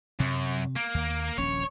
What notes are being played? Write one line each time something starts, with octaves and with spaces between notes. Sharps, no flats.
F#2 C3
A#3
D#2
D#1 A#1 C#4 C#5